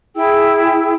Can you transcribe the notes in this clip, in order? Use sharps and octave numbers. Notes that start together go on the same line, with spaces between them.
E4 G#4 G5 E6